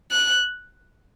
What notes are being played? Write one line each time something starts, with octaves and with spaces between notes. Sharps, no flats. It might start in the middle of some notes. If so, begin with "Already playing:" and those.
F#6